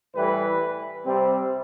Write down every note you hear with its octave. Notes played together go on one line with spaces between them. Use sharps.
A2 E3 G3 B4
C3 G3 C4